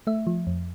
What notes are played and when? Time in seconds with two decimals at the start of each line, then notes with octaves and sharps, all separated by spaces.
0.07 A3 E5
0.27 F3
0.47 F2